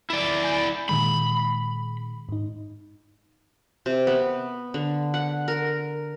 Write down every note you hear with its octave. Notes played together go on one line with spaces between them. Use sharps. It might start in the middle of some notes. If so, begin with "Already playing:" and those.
E4 D5
G#5 G6
A#2 D#3 G#3 B5
G#2 D#4
C3
B3
D3
F#5
A#4